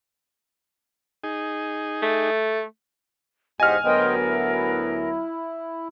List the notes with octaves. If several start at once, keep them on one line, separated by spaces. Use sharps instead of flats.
D#4 G#4
A3
E2 G#2 G4 C5 D#5 F#5 G#5 F6
D2 F#3 B3 A#4 C5 D#5 G5
E4